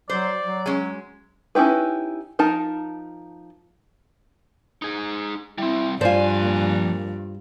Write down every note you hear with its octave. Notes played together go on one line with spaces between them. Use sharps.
F#3 C5 D5
F#3
G#3 C#4
C#4 D#4 E4 G4 B4
F3 D#4 A#4 A5
D#4 G#4
G3 C4 E4
G2 F3 F4 C5 D5 G#5
A#2